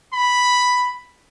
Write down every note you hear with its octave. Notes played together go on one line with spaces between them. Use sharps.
B5